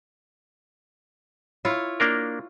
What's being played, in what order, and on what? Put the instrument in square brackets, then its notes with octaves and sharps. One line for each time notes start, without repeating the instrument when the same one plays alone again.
[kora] E4 F4 C#5
[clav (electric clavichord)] A#3 D4 A#4